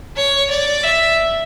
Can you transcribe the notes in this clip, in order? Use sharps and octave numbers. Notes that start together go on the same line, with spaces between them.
C#5
D5
E5